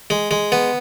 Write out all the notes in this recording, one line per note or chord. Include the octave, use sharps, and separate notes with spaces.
G#3
G#3
B3